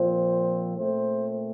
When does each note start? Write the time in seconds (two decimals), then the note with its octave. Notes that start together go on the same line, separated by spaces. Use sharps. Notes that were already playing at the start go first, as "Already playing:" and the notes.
Already playing: A#2 F3 C4 C5
0.77 A#2 A3 C4 C5